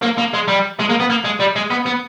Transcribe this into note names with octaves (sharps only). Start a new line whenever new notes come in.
A#3
A#3
G#3
G3
G#3
A#3
B3
A#3
G#3
G3
G#3
B3
B3